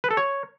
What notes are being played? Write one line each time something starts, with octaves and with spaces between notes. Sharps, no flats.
B4
A4
C#5